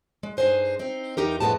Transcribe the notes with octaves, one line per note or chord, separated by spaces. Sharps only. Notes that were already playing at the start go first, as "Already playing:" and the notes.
G#3
G2 D#4 G#4 C5 G#5
C4 D#4
E2 D#4 G4 A#4
F2 A2 C#3 G#3 B3 A5